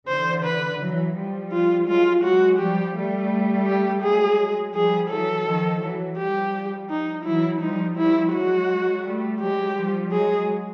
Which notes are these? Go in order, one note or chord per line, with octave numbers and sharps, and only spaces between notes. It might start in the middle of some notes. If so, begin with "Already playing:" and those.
D3 E3 C5
B4
E3 F#3
F3 G3
F4
F#3 G#3 F4
F#3 G#3 F#4
F3 G3 G4
G3 A3
G4
F#3 G#3 G#4
F3 G3 G#4
E3 F#3 A4
D#3 F3
E3 F#3
F3 G3 G4
D#4
E3 F#3 E4
F3 G3 D#4
F3 G3 E4
F#3 G#3 F#4
G3 A3
F#3 G#3 G4
F3 G3
F#3 G#3 G#4